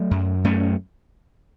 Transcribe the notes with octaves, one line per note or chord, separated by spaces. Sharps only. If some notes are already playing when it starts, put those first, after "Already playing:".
Already playing: F#3 A3
F#2
F#2 A3 C#4